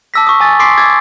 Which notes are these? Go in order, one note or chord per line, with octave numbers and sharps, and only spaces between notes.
A5 D6 E6 A#6 B6
C#6 D#6
G#5 D#6 A6
C6 D6 D#6 B6 C7 D7
D6 E6 G#6 A6